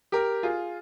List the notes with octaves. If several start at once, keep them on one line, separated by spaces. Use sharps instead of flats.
G4 A#4
F4 G#4